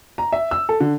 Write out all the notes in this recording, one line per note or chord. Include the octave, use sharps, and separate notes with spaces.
A#5
E5
E6
A4
D3